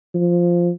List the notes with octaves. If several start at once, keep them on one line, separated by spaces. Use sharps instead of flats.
F3